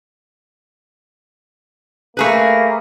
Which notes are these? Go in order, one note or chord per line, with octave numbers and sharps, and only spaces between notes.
A3 A#3 G#4 B4